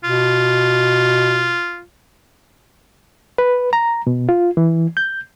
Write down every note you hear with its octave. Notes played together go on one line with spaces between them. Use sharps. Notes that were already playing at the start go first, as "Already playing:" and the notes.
B2 F4
B4
A#5
B2
F4
E3
G6